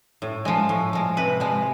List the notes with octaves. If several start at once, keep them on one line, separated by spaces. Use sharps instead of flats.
A2
F3 G#3
A2
F3 G#3
C3 B4
F3 G#3